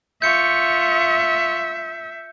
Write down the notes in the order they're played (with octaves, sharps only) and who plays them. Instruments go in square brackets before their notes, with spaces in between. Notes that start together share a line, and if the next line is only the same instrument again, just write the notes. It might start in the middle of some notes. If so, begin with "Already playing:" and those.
[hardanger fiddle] F4 C#6 [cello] E5 [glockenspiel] G6 C#7